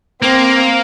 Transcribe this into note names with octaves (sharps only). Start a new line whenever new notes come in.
A#3 C4